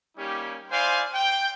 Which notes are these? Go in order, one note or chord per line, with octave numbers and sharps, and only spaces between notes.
G3 A#3 C#4 D#4 G4
E4 C5 D5 F5 G#5 C6
G5